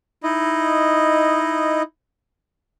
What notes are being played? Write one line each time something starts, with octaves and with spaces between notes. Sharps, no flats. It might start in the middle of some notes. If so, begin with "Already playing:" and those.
D#4 E4 D#5